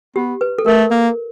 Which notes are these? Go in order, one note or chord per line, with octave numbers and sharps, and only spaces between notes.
B3 G4
B4
A4
A3 A#4
A#3